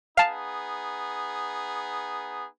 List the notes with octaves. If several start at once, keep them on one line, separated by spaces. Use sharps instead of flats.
B3 D#4 G#4 F5 A5